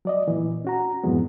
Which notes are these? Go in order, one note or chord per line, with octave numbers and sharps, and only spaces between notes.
F#3 D5 D#5
A#2 E3
C#4 F#4 A#5
F2 G#2 E3 F#3 G#3 B3